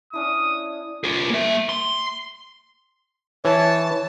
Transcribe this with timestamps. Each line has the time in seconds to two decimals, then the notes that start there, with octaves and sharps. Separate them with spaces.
0.13 C#4 D4 E4 D#6
1.04 F4 G#4
1.30 A#3 E5
1.69 C6
3.45 E3 C#5 A5